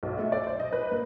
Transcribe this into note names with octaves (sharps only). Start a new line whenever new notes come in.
B1
A3
D5
C5
D#5
B4
A#3